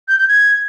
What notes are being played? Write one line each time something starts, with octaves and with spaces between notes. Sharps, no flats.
G6
G6
G#6